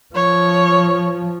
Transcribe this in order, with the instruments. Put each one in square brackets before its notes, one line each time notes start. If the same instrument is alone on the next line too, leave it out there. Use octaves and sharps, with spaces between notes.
[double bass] F3 [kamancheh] C#5